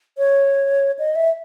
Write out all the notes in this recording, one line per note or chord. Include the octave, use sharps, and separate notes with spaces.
C#5
D#5
E5